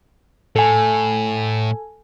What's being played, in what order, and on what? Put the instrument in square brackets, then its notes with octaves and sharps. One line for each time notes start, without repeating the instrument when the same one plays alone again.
[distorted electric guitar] A2 [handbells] A4 G#5